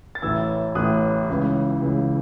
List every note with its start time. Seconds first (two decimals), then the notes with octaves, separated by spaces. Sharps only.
0.15 A6
0.22 A1 A2 E3 E6 G#6
0.75 A1 A2 E3 D#6 F#6
1.29 C#2 C#3 E3
1.82 C#2 C#3 E3